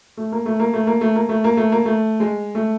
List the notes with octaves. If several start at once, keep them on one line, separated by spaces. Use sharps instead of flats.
A3
A#3
A3
A#3
A3
A#3
A3
A#3
A3
A#3
A3
A#3
A3
G#3
A3